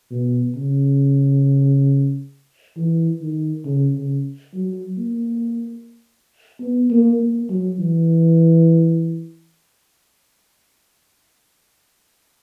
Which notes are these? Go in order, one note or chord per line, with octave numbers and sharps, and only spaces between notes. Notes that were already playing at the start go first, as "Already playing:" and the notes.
B2
C#3
E3
D#3
C#3
C#3
F#3
A#3
B3
A#3
A#3
F#3
E3